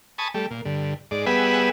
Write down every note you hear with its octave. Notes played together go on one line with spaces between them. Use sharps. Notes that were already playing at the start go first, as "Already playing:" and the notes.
G#5 A5 B5 C#6 D#6
G3 A3
A#2
G2 D3
G#2 D5
G3 B3 G#4 B4 E5 F#5